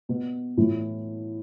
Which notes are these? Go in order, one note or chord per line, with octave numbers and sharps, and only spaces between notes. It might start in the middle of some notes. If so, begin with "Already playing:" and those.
B2
A2 E3